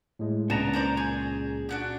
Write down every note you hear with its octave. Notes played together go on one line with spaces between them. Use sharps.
A2 G#3
C#2 A#2 B3 C#4 D4 A5 A#5
A#4 C5 D5
G#4
D4 F#4 G4